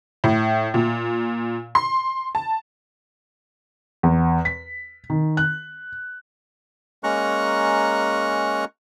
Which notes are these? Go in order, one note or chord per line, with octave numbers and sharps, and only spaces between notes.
A2
A#2
C6
A5
E2
B6
D#3
F#6
G#3 A#3 C#4 A#5 C#6 F#6